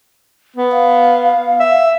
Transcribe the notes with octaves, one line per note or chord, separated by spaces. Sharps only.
B3
F5
E5